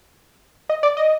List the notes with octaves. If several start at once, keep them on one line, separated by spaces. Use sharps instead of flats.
D#5
D5
D#5